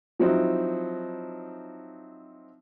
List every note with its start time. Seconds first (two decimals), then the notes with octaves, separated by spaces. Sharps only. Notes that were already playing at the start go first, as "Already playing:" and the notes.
0.20 F3 F#3 C4 D#4 E4